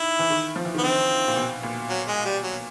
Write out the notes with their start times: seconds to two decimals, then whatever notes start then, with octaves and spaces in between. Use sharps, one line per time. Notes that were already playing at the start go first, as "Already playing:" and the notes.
Already playing: D#3 E4
0.19 E3
0.30 D#3
0.56 F3
0.65 E3
0.74 D#3 B3
0.83 D3 C4
1.28 A#2
1.36 B2
1.63 A#2
1.89 F#3
2.08 G#3
2.25 G3
2.43 F#3